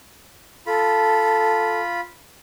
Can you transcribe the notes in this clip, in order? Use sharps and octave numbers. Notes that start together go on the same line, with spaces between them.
F4 A4 B5